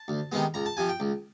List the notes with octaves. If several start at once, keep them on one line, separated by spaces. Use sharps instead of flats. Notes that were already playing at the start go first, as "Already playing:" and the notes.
Already playing: A5
D2
C3 D#3 G#3 B3
C#2 A#5
A5
C3 F3 G#5
G5
C#2